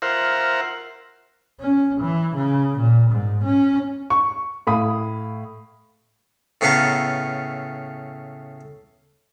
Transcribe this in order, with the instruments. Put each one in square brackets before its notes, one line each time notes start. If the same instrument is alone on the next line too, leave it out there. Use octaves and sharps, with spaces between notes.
[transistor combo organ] F4 A#4 C5 E5 F#5
[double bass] C#4
E3
C#3
A#2
G#2
C#4
[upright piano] C#6
A2 F5 B5 D#6
[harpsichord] A2 C#3 B3 A4 F5 A#5